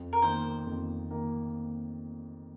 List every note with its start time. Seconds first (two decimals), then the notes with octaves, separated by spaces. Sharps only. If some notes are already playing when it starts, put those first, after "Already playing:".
Already playing: F2
0.13 A#4
0.22 D#3 A#3 C5
0.66 F2
1.11 D#3 A#3